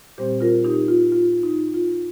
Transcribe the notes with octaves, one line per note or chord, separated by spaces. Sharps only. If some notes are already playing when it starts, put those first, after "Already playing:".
A#2 G3 C4 G4 C5
F4 A#4
D#4 G4
F4
F4
D#4
F4